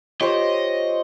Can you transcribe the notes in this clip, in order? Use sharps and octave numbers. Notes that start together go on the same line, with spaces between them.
F4 G4 C5 C#5 D#5 D7